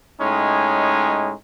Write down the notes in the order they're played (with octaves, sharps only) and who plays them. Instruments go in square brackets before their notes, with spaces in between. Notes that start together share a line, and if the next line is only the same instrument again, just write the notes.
[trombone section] A2 G#3 C#4 D#4